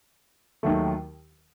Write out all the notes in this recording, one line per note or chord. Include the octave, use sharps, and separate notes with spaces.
D#2 D#3 F#3 A3